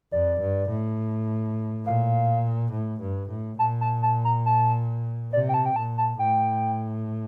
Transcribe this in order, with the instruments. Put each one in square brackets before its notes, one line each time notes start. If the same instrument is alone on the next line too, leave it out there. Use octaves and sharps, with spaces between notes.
[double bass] F2 [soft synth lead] D5
[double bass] G2
A2
[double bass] A#2 [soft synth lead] F5
[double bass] A2
G2
A2
[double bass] A#2 [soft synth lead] A5
[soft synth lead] A5
A5
A#5
A5
[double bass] C3 [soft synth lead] D5
[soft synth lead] G5
A5
G5
[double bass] A#2 [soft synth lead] A5
[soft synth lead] A5
[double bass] A2 [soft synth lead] G5